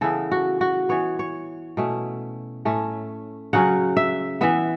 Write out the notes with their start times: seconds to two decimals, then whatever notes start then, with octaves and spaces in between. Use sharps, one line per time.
0.01 C#3 E3 B3 A4
0.32 F#4
0.61 F#4
0.89 E3 B3 C#5
1.19 C#5
1.77 B2 A3 C#4
2.65 A2 A3 C#4
3.53 C#3 F#3 C#4 F#5
3.97 E5
4.41 E3 B3 E5